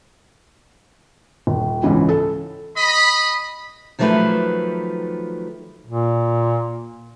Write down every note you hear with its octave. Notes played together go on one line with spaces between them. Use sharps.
D#1
C#2 G#2 C#3 E3
A4
D#5 B5
D#3 F3 F#3 A3 G4 B4
A#2